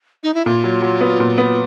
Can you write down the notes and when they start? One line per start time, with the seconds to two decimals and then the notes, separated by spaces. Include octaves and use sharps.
0.23 D#4
0.34 E4
0.46 A#2 F4
0.64 F#3
0.82 F#3
1.01 B3
1.20 A#2
1.38 B3